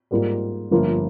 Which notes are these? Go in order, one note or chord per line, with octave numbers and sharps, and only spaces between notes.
G#2 G3 A#3 F4
G1 G2 F3 A#3 F4